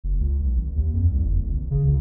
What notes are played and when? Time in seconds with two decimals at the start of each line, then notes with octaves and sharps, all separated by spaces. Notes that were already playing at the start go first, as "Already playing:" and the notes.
0.04 F#1
0.20 C#2
0.44 B1
0.57 G#1
0.76 D#2
0.94 F2
1.11 C2
1.25 F#1
1.41 F#1
1.56 G#1
1.71 C#3
1.84 C#2